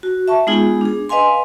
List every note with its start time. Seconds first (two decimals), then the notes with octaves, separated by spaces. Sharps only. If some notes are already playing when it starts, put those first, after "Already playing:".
0.03 F#4
0.28 E5 A5 C#6
0.47 G#3 B3 D#4 F4 G#4
0.81 D4 G#4
1.09 B4 D#5 F5 G#5 C6